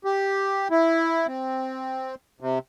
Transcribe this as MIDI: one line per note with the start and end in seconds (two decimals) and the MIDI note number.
0.04 0.68 67
0.71 1.27 64
1.27 2.15 60
2.41 2.59 48